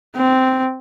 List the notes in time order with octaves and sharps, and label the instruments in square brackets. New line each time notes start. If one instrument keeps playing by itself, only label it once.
[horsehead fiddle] C4